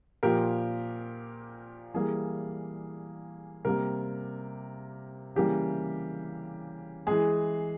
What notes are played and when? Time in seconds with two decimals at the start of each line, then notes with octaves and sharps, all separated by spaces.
0.23 A#2 F3 A#3 G4 A#4
1.94 E3 G3 A#3 G#4
3.65 C3 G3 A#3 G4 A#4
5.36 C#3 E3 G3 A#3 G4
7.07 E3 G#3 G#4